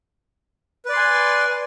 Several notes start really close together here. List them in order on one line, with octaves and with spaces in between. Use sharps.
B4 D5 C6 G#5